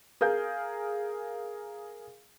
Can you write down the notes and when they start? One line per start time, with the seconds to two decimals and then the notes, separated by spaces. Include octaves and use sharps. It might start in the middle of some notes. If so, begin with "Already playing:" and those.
0.21 G#4 A#4 F5 G6